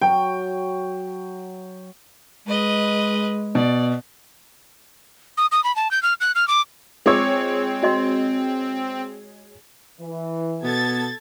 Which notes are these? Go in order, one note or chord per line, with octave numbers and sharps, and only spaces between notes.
F#3 G5
G#3 B4 D#5
B2 D5
D#6
D#6
B5
A5
G6
F6
F#6
F6
D6
G#3 C4 F4 C#5 D6 E6
F#4 D#5 C6
E3
B2 B3 A4 G#6 A6